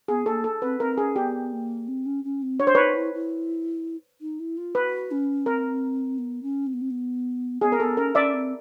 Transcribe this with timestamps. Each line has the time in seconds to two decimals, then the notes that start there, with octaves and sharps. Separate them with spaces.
0.08 B3 G#4
0.26 A#3 A4
0.44 A4
0.62 C4 B4
0.80 C4 A#4
0.98 C#4 G#4
1.16 B3 G4
1.52 A#3
1.87 C4
2.05 C#4
2.24 C#4
2.42 C4
2.60 D4 C#5
2.67 C5
2.75 D#4 B4 C#5
2.95 E4
3.13 E4
4.21 D#4
4.39 E4
4.57 F4
4.75 F#4 B4
5.11 C#4
5.46 C4 A#4
6.18 B3
6.42 C#4
6.66 C4
6.73 B3
6.81 C4
6.90 B3
7.61 B3 G#4
7.72 A#4
7.79 B3 A4
7.97 C#4 A#4
8.15 C#4 D5 E5
8.33 C4